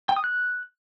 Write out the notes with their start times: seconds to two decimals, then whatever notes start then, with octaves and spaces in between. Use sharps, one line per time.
0.09 G5
0.16 D#6
0.24 F#6